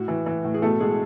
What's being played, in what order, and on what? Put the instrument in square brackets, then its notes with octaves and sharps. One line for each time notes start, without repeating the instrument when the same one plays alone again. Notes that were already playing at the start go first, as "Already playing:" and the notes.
Already playing: [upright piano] A2 F#4
E3
E3
A2
G#4
B2 A3 A4
B2 G#3 G#4